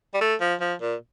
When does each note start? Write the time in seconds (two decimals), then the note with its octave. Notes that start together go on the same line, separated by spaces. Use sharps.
0.14 G3
0.21 A3
0.41 F3
0.61 F3
0.81 A#2